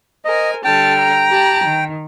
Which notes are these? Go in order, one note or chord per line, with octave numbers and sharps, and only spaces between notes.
A#4 C5 D#5 G#5
D3 G3 G5 A5 F6
A#5
G4 A5 B5
D#3